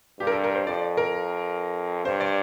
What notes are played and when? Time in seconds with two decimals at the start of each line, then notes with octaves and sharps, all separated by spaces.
0.20 G2 G4
0.27 A#4
0.32 A4
0.44 A#4
0.55 C5
0.67 F2 D5
0.97 A#4
2.05 G2 C5
2.20 D5